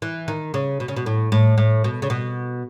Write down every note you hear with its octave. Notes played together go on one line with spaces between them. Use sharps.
E3
D#3
C#3
B2
C#3
B2
A2
A2
A2
B2
C#3
B2